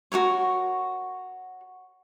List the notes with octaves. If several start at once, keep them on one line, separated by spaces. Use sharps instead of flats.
F#4 G4 A#4 C#5